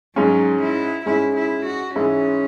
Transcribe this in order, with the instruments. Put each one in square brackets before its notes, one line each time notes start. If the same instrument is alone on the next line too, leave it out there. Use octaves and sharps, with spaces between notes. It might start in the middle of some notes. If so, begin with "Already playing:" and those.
[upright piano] G#2 G#3 C#4 [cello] F#3
[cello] E4
[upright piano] G#2 G#3 C#4 [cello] E4
[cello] E4
F#4
[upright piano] G#2 E3 G#3 E4 [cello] C#4